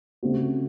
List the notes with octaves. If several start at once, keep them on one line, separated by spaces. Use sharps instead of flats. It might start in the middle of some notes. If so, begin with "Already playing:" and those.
C#3 A3 C4 F#4